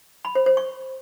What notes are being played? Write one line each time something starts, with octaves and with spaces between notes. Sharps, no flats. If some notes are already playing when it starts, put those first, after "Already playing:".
B5
C5
C5
C#6